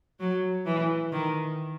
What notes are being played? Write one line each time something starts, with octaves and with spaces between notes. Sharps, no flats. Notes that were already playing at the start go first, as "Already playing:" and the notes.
F#3
E3
D#3